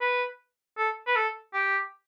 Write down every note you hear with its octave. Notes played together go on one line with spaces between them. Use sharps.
B4
A4
B4
A4
G4